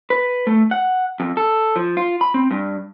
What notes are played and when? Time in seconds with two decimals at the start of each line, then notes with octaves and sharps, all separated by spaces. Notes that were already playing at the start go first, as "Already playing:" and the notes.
0.10 B4
0.47 A3
0.71 F#5
1.20 F2
1.37 A4
1.76 F3
1.97 F4
2.21 B5
2.34 C4
2.51 G2